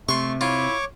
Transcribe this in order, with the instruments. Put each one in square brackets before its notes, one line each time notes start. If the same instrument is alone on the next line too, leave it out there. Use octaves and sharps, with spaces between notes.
[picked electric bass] C3 [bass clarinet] A3 [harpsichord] C6 C#6
[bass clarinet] E4 [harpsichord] F4 [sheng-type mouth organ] C#5 C#6 D6